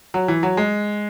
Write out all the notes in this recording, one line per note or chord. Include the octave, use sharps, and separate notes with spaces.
F#3
E3
F#3
G#3